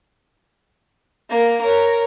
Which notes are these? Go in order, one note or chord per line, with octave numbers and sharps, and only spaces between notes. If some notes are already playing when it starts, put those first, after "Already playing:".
A#3
A#4 C#5